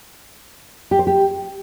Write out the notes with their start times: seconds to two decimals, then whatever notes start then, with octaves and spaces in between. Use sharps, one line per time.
0.91 G4
0.99 C5
1.07 G4